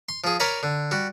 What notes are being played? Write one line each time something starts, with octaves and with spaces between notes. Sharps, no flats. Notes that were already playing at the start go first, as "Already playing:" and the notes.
C6
F3 G#4
A#4 C#5 D5 G#5 A#5 B5
D3
G3 F#4